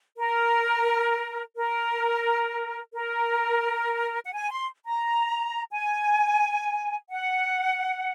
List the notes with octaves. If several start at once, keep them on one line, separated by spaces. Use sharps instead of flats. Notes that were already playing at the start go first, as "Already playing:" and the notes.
A#4
A#4
A#4
F#5
G#5
C6
A#5
G#5
F#5